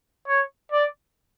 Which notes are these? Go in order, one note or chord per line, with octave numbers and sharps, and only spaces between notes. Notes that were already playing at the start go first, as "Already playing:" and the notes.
C#5
D5